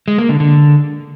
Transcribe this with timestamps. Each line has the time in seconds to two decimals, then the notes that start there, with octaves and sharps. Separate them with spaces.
0.08 G#3
0.18 A#3
0.29 D3
0.40 D3